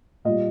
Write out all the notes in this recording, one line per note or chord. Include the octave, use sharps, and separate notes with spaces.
A#2 G3 D#5